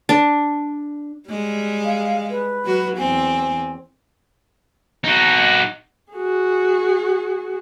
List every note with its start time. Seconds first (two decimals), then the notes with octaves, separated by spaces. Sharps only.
0.09 D4
1.30 G3 G#3
1.84 F5
2.30 B4
2.65 F#3 F#4
2.98 E2 C4 G#5
5.04 D#4 F#4
6.13 F#4 G#4